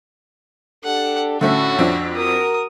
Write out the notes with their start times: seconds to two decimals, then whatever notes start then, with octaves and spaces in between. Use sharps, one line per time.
0.84 D4 G4 A4 F#5
1.41 A2 D3 A3 C#4 F#4
1.78 F2 C4 D4
2.16 F#4 A#4 D#6